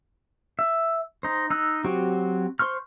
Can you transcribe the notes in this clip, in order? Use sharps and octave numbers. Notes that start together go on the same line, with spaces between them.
E5
D#4 C5
D#4 E6 F#6
F#3 C4 F#4 G4
C5 C6 C#6 F6